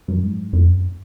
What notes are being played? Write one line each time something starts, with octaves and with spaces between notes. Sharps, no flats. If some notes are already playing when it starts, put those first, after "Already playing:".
F#2
G#2
F2
F#2